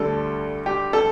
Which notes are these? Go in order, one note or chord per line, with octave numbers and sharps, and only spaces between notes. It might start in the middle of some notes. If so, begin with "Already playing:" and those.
Already playing: D2 D3 G3 A4
G4
A4